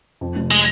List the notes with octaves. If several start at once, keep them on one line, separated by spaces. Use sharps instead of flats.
F2
F1
G#3